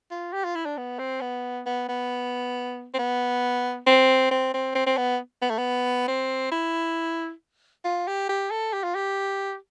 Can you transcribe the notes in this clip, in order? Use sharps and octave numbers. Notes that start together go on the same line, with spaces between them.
F4
G4
F4
E4
D4
B3
C4
B3
B3
B3
C4
B3
C4
C4
C4
C4
C4
B3
B3
A3
B3
C4
E4
F4
G4
G4
A4
G4
F4
G4